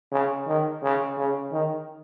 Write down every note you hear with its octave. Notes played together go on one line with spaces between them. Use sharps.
C#3
D#3
C#3
C#3
D#3